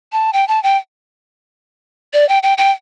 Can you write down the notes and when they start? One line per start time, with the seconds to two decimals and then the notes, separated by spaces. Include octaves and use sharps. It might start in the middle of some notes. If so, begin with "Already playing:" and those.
0.12 A5
0.33 G5
0.48 A5
0.63 G5
2.13 D5
2.29 G5
2.43 G5
2.58 G5